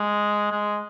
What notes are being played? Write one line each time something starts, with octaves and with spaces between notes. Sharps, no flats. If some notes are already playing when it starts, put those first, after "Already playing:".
Already playing: G#3
G#3